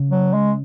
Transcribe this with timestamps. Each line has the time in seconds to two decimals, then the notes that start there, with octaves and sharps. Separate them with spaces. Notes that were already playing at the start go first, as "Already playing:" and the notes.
Already playing: C#3
0.11 F#3
0.34 G#3